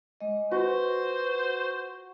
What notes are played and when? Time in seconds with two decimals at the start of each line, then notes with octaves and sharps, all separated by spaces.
0.21 G#3 D#5
0.52 F#4 B4 C5